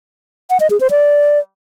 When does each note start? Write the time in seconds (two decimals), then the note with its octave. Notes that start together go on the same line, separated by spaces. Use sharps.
0.50 F#5
0.60 D#5
0.70 G#4
0.80 C5
0.91 D5